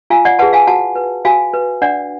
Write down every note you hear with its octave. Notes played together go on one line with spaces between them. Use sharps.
F4 F5 G#5
D5 F#5
G#4 B4 F#5 A5
F5 G#5
F#4 F#5 A5
B4
F#4 F5 G#5
B4
D4 D5 F#5